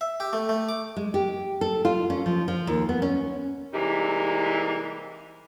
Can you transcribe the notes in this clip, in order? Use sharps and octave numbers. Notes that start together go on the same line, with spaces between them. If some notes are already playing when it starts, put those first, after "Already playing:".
E5
G4
A3
A3
D6
G#3
G4
A4
F4
C#4
F3
F3
D#2
B3
C#4
C3 E3 G3 G#3 A#3 D#4